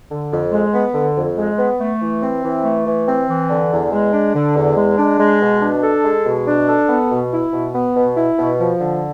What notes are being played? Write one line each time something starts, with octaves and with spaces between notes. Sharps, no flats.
D3
F2
G#3
B3
D3
F2
G#3
B3
A3
E3
C4
E3
A3
E3
C4
E3
D3
E2
G#3
D4
D3
E2
G#3
D4
G#3
B2
D4
A4
G#3
B2
D4
A4
B3
B2
E4
B2
B3
B2
E4
B2
F3
D3